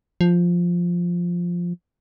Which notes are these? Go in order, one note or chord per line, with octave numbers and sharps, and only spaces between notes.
F3